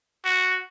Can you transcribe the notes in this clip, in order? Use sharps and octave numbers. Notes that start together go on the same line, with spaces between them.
F#4